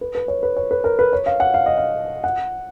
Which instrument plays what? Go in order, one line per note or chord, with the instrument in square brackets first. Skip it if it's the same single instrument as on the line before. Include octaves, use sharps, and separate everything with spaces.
[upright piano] B4
B4
C#5
B4
C#5
B4
A#4
B4
C#5
F5
F#5
F5
D#5
F5
F#5